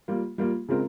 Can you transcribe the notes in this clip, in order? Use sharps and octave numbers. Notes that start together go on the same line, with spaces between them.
G3 A#3 F4
G3 A#3 F4
C#3 G#3 C4 F4 A#4